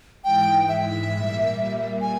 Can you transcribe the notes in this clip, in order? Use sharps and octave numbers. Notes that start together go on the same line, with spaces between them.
G#2 E3 G#3 G5
E5
A#2 G3 A#3
G#5